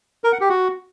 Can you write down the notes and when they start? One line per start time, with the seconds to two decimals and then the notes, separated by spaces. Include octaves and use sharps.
0.24 A#4
0.32 F#5
0.41 G4
0.49 F#4